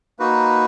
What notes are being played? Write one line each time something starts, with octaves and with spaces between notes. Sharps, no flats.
A#3 D#4 F#4 B4